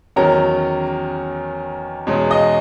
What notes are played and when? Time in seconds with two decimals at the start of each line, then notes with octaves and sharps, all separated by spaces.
0.16 E2 D#3 F#3 C#4 A#4 A#5
2.07 E2 B2 G#3 C#4
2.31 D#5 D#6